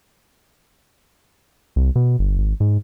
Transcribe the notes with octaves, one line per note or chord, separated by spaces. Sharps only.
C2
B2
G1
G#1
G#2